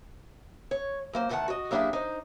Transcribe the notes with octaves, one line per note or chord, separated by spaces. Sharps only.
C#5
F#3 A#3 C5
D2 A2 D#3 D5 F#5 A5
F#4 D#5
F#3 A#3 D4 E4 G4 G#4
D#4 C5